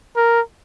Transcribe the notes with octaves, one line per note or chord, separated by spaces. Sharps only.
A#4